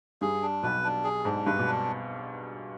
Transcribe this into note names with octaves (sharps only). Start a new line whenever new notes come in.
G2 G3 G#4
D4
B1 B2 B4
D4
G#4
G#2 D4
G2 B4
B2
D4